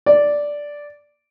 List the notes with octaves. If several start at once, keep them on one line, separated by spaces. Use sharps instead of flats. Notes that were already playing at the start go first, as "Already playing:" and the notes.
D5